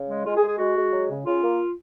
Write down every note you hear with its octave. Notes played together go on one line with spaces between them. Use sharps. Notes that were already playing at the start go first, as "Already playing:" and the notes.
Already playing: C#3
G#3
G#3 F4
G#4
G#3
G#4
G#3 F#4
G#3
F#3
C#3
C#3 F4
A#3